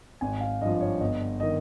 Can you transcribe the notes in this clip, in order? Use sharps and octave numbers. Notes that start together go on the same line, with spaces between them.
G#1 G#5
F5
G2 F3 D#5
D#5
C#5
G1 D#5
D#3 D#5